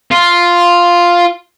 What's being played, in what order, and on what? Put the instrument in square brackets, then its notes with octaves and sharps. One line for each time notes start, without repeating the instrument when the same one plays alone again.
[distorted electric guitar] F4